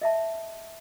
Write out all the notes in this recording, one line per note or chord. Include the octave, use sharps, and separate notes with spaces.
D#5 E5 A5